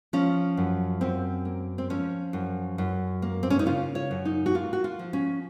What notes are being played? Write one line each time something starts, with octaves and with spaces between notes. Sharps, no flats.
F3 C#4
F#2
F#2 C4
A#3
C4
F3 C#4
F#2
F#2
A#3
C4
C#4
D#4
C#3 F4
C#5
F#2
D#4
F#4
A#3 F4
F#4
F4
F3
C#4